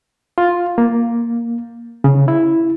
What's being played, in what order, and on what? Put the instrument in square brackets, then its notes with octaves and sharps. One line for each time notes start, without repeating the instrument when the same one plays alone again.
[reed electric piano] F4
A#3
C#3
E4